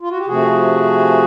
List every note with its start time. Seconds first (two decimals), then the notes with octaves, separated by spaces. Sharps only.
0.01 F4
0.10 F#4
0.17 G4
0.27 C3 F3 A3 F#4 G#4